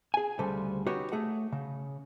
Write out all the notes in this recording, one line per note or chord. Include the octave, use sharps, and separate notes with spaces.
G#4 G#5
D2 C#3 G3 A4 C5
D#4 F#4 G4 B4 C#5
A3 G#4 F#5
C#3